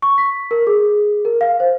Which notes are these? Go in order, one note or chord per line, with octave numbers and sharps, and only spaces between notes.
C#6
B6
A#4
G#4
A#4
F5
C5